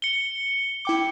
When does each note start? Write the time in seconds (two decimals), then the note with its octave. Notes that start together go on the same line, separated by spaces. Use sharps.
0.02 C#7 G7
0.85 E4 G5 D6